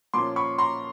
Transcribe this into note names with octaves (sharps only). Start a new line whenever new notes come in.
A#2 F3 A#3 C#4 C6 D6
B5 C#6
A#5 C6